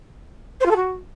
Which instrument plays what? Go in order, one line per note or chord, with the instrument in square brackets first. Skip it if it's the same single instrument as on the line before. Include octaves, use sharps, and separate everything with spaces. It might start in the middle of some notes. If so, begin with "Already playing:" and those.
[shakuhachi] C5
F4
A4
F#4